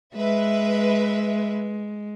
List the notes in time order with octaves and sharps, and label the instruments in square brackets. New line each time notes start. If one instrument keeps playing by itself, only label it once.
[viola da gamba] G#3 [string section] B4 E5